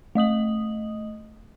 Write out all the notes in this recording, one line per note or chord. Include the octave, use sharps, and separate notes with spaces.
A3 D#5 D#6 F#7